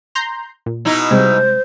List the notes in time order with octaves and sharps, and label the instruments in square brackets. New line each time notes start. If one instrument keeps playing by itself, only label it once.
[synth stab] A#5 C6 G6
A#2
[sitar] B2 D#4 E4
[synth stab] C3 G3 G#3 [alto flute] C5